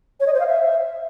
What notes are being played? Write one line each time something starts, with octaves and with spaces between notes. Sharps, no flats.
C#5
D#5
C5
F5
E5